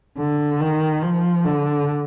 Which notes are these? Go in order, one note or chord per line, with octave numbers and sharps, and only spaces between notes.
D3
D#3
F3
D3